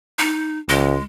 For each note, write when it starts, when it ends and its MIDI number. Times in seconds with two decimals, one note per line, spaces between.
0.19 0.58 63
0.69 0.97 37
0.69 1.02 56